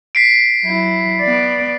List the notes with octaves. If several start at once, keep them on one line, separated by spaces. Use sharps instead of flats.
B6 C7 D7
F#3 E4
B3 D5